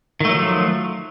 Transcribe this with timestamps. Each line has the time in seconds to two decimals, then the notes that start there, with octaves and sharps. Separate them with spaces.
0.20 D#3
0.25 A3
0.29 F#3
0.34 F3